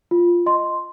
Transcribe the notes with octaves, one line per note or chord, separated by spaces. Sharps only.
F4
D#5 C6